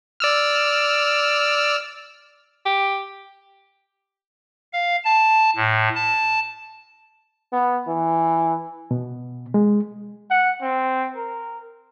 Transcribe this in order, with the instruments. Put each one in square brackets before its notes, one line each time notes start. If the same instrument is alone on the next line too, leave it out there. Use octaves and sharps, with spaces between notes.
[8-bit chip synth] D5 E6 F6
[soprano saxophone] G4
[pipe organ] F5
A5
A2
A5
[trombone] B3
E3
[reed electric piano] B2
G#3
[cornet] F#5
C4
A#4